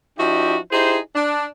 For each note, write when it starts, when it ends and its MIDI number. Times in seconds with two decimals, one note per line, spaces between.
0.19 0.57 53
0.19 0.57 62
0.19 0.57 64
0.19 0.57 66
0.19 0.57 67
0.19 0.57 75
0.71 0.99 63
0.71 0.99 64
0.71 0.99 67
0.71 0.99 68
0.71 0.99 72
1.15 1.45 62